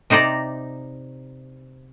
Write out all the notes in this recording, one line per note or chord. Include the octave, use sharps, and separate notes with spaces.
C3 D#4 C5 D5 A#5